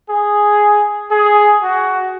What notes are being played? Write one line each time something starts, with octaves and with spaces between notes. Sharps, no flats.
G#4
G#4
F#4